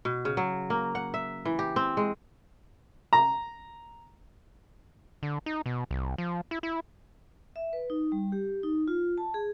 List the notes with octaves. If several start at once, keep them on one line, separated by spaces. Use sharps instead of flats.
B2
C#3
F#3
A#3
F#5
E5
E3
G4
C4
G#3
A#5
D3
D#4
B2
C2
F3
E4
E4
E5
B4
D#4
G3
G4
D#4
F4
A5
G#4